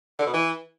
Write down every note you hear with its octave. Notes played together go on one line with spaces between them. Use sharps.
D3
B2
E3